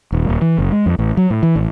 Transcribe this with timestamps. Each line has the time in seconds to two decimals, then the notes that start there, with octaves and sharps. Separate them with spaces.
0.12 D#1
0.29 D#1
0.42 E3
0.58 F#1
0.72 G#3
0.86 F2
0.99 A1
1.17 F#3
1.30 A2
1.43 E3
1.56 A1